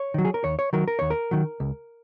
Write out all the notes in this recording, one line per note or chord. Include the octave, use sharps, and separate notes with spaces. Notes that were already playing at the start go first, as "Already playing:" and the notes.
Already playing: C#5
D#3 F#3
G#4
A#4
D#2 C#5
C#5
D#3 F#3 A#4
A#4
D#2 C#5
A#4
D#3 F#3
C#2